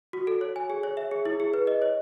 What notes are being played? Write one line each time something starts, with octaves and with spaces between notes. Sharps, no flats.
F#4
A4
C#5
G#5
G#4
C#5
E5
G#4
E4
G#4
B4
D#5
C#5